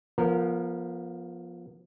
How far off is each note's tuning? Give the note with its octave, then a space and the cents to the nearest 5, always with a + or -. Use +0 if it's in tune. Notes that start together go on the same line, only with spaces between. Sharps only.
F3 +0 B3 -35 A#4 -20